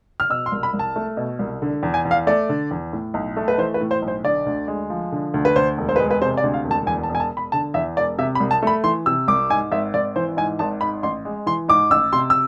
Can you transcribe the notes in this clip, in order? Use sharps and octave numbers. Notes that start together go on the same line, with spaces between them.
F6
B2 E6
C6
C2
B5
C2
A5
A3
B2
C2
D3
E2
G#5
E2
F5
A3 D5
D3
E2
A2
B1
A3
B4
E3 C5
B4
A2
C5
B1
C5
D3 D5
D2
G#3
F3
D3
D2
B4
D2 C5
E1
C5
B4
G#3
B4
C3 C5
D5
D2
F5
E1
A5
E2 G#5
A5
E1
G#5
A5
E1
B5
D3 A5
E2 E5
E1 D5
C3 E5
B5
C2
A5
A3 B5
E3 C6
C3 E6
C2 D6
G#2 G#5
G#1 E5
G#1 D5
E3 C5
G#2 G#5
G#1 A5
G#2 B5
A1 C6
G#3
E3 C6
G#2 D6
A1 E6
C3 C6
E6